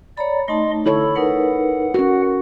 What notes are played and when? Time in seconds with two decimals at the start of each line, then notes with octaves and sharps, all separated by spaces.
0.18 C#5 D5 A#5 B5
0.48 A3 D#4 D#5 A5 C6
0.86 D3 E4 A4 C#5 B5
1.16 D#4 A#4 B4 F#5
1.94 C#4 F#4 A#4